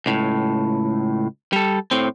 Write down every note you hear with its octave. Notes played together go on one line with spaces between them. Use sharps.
C#2 A2
G3 A4
A2 C4